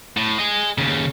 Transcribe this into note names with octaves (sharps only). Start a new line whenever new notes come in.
A2
G#4 D#5
D#2 C#3